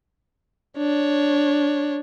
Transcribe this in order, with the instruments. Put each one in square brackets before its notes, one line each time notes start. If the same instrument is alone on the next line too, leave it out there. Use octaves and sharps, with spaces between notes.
[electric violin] D4 C#5